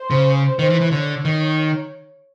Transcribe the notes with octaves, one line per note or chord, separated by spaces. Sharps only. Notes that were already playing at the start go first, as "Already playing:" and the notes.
Already playing: C5
C#3
D#3 C5
E3
E3
D3 C#5
D#3